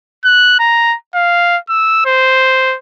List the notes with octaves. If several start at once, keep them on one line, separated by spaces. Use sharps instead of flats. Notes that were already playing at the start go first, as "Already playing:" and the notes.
F#6
A#5
F5
E6
C5